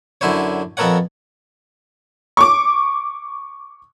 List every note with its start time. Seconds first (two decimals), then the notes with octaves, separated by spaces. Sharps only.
0.21 F#2 D3 E4 C5 C#5
0.77 F2 B3 A4 A#4 C#5 F#5
2.37 C#6 D6